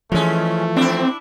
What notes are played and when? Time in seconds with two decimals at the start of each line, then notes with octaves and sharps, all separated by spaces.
0.12 E3 F3 G#3 A3 C#4
0.76 C4 D4 E4